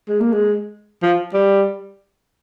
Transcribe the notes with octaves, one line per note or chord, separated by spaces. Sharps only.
G#3
A#3
G#3
F3
G3